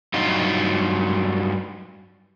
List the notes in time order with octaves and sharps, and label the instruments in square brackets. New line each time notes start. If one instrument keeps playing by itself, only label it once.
[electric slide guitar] G2 F#3 D#4 F4